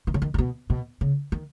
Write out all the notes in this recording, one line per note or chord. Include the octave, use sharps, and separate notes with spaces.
D#3
C#3
D#3
C#3
B2
B2
C#3
D#3